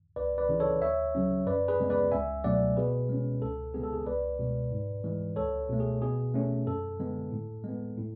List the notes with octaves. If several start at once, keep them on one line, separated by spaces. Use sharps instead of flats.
C#2 B4 D5
B4 D5
C#3 E3
A4 C#5
D2 C#5 E5
C#3 F#3 C#4
F#2 B4 D5
G#4 B4
C#3 G#3 B3
B4 D5
C#2 E5 G#5
B2 F#3 A3 D5 F#5
B2 G#4 B4
G#3 C#4
C#2 A4
C#3 G#3 B3 G#4
A4
G#4
C#2 B4 D5
B2 G#3
G#2
E3 G#3
C#2 A4 C#5
B2 A3
G#4
B2 G#4
A3 C#4
F#2 A4
D3 G#3 B3
A2
G#3 B3
A2